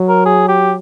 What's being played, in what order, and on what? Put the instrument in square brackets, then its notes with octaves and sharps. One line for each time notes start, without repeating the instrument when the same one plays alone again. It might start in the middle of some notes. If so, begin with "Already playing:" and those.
Already playing: [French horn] F#3
[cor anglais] A#4
G#4
G4